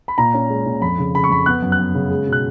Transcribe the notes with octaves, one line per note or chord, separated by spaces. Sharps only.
B5
A#2 A#5
C#4
G#3
A#2
F2 B5
C#3
C#3 B5
C#6
F2 B5
B3 F#6
F#2
F#6
B3
C#3
G#3
B2
F#6